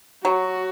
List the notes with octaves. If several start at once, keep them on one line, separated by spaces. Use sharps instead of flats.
F#3 F#4